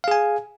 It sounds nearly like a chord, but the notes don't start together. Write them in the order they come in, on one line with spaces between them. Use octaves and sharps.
F5 G#4 G#5